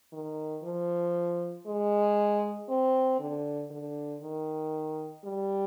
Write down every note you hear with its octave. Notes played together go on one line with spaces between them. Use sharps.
D#3
F3
G#3
C4
D3
D3
D#3
G3